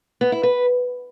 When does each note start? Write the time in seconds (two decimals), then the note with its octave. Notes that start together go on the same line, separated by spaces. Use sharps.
0.21 B3
0.32 E4
0.43 B4